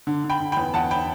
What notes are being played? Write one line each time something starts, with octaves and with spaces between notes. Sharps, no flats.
D3
D3
G5 B5
D3
E2 G5 B5
E2 F#5 A5
G5 B5